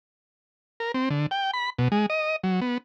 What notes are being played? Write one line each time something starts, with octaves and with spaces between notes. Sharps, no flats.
A#4
C4
D3
G5
B5
B2
G#3
D#5
F#3
B3